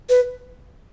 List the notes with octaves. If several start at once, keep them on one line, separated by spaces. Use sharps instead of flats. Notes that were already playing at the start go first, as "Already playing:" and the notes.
B4